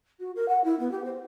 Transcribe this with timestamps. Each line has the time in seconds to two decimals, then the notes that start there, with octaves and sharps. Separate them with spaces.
0.19 F#4
0.35 A#4
0.48 F#5
0.64 E4
0.79 B3
0.91 G4
1.04 C5